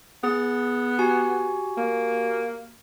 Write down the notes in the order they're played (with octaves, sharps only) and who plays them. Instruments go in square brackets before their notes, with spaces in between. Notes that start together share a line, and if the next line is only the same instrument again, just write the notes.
[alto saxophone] B3 [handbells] G#4 A6
[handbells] F#4 G4 G#5
[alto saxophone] A#3